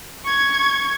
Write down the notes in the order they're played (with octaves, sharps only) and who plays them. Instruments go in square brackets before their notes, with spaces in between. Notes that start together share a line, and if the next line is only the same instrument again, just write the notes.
[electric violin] C#6 G#6